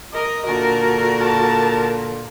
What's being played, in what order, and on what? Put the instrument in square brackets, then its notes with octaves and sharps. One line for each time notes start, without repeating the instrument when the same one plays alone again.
[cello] A#4 [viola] D#5
[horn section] A#2 D3 [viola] F#4 [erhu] A5
[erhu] A5